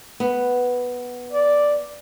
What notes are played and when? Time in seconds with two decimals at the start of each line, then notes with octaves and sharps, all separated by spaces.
0.20 B3
1.32 D5